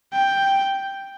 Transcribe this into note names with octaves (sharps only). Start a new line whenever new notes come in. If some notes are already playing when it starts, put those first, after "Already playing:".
G5